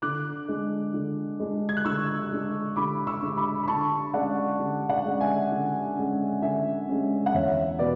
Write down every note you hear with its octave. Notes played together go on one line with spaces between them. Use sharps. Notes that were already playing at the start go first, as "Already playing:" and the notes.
D3 D6 F#6
G#3 D4
D3
G#3 D4
G#6
F#6
D3 C#6 E6
G#3 D4
D3 B5 D6
C#6 E6
G#3 D4
B5 D6
B5
D3 A5 C#6
G#3 C#4 D5 F#5
D3
D5 F#5
G#3 C#4
E5 G#5
D3
G#3 C#4
D3 E5 G#5
G#3 C#4
F#5
E2 C#5 E5
B2 B4 D5